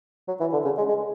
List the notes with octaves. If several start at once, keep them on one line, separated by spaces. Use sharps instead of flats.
F#3
E3
D3
C#3
G#3
G#3